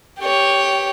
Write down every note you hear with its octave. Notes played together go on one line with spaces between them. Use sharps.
G4 C#5